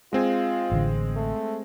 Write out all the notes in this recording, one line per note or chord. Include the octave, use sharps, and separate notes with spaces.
G#3 C4 F4 G#4
A1 D3
A3